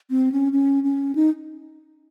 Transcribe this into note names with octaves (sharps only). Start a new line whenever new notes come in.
C4
C#4
C#4
C#4
D#4